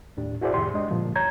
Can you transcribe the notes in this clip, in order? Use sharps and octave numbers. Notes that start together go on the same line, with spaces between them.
D#2 A2 D4 G4
E4 F#4 G#4 C5 D5 E5
C2 F2 A2 D#3 G4 C6
G#3 D4 D#5
G2 A#2 D3 F3 A#3
C#2 C#5 A#5 G6 G#6